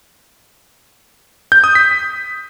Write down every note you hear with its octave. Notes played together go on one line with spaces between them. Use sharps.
G6
D#6
B6